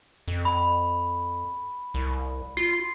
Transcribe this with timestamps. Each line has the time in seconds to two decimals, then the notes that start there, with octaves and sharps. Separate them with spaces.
0.28 F2
0.45 B5
1.94 C2
2.57 F4 C7